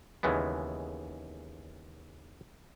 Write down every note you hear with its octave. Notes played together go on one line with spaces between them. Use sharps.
D#2 C#3 E3 G#3 B3